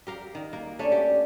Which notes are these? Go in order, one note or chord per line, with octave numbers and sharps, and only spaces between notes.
G4 A#4 F5
D#3
A#3
A3 C#4 D4
G4